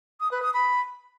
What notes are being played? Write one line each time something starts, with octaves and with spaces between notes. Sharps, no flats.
D#6
B4
D#6
B5